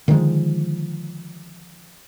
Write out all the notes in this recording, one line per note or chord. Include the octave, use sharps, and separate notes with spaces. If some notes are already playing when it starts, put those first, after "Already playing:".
D3 D#3 F3 G#3